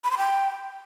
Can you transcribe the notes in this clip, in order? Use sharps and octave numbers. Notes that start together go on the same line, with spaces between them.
B5
C6
G5